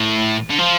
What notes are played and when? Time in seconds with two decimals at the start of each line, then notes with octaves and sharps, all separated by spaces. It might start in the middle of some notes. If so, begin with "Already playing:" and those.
Already playing: A2
0.50 D3
0.58 F3